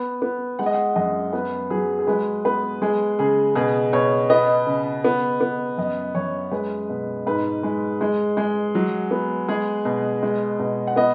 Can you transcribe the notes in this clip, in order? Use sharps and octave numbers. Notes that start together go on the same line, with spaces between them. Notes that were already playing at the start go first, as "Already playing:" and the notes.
Already playing: B3
B3
G#3 F#5
D#5
F#5
F#2 D#5
B3 B4
F#3 G#4
G#4
G#3 B4
B3 B4
G#3 G#4
C#3 G#4
B2 G#4
B2 C#5
B3 D#5
C#3
B3
B3
F#2 D#5
F#2 C#5
G#3 B4
B2
G#2 B4
G#3
G#3
G#3
F#3
B3
G#3 G#4
B2
G#3
B2
F#5
B3 D#5